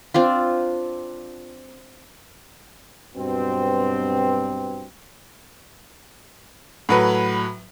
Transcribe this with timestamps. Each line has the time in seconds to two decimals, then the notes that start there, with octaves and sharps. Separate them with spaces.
0.14 C4 D4 F4
3.16 G2 B2 F#3 C4
6.89 A2 F#3 B4